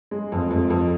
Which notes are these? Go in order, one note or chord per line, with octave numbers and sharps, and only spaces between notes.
G#3
F2
F2
F2